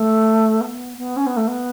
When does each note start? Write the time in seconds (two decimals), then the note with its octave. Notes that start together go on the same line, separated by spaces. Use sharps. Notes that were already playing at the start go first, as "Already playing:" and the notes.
Already playing: A3
0.60 B3
0.97 B3
1.16 C#4
1.26 B3
1.36 A3
1.47 B3